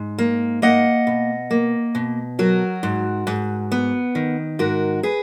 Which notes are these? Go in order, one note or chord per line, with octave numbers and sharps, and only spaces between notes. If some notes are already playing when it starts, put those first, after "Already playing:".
Already playing: G#2
A#3
A#3 D#5 F#5
B2
A#3
B2
F#3 F#4 A#4
G#2
G#2
B3
D#3
G#2 F#4 A#4
G#4 B4